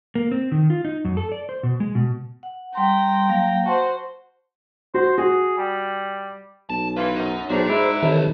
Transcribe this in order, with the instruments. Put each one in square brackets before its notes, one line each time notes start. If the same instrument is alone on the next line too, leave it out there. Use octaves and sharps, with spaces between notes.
[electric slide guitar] A#3
C4
D#3
F4
D#4
F#2
A4
D5
C5
B2
G#3
B2
[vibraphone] F#5
[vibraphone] G3 C6 [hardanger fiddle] G5 A#5
[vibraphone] F#3 A#3 F5
[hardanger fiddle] F#4 C5 [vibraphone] A5 C6
[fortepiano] F#4 [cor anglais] C5
[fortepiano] F#4 [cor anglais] G#4
[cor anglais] G3
[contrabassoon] B1 [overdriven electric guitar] A5
[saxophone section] E3 F4 [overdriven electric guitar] B4
[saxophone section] F#2 [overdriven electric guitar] D#4
[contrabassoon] B1 [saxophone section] A2 C#3 D4 [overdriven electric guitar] F#4 A#5 [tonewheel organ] C5
[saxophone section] D2 D4 E4 [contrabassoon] G#2
[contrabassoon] C3 [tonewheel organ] D#3 E3 A4 [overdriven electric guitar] B4 C#5